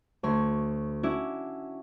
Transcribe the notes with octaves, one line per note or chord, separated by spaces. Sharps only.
D2 C#5 C6
C#4 D4 E4 F#4